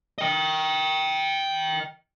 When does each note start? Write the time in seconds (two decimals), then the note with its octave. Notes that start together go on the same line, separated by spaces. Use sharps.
0.18 D#5 G5